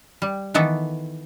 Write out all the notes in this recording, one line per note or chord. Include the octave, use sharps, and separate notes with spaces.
G3
D#3 E3 B3 A4